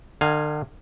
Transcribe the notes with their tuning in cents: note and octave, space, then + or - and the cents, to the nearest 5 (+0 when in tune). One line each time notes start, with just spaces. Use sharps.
D3 +45 F5 +0 G#5 +0